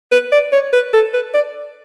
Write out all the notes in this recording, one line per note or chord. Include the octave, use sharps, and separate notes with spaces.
B4
D5
C#5
B4
A4
B4
D5